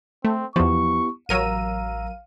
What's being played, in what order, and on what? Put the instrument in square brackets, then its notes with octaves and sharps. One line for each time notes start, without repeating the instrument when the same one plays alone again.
[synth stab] A3 [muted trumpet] C4
[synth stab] E2 F3 [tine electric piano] B3 E4 G4 [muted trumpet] C#6
[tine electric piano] A1 A#5 E6 [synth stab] F#3 A#4 D#7 [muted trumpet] F5